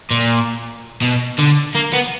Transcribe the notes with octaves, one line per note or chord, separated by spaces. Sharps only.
A#2
B2
D3
A#3
B3